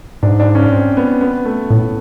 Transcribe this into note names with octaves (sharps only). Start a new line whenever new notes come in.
G#2 D4
D4
C#4
C4
B3
B3
A3
A2 A3